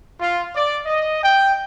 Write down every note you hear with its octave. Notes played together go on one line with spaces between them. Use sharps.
F4
D5
D#5
G5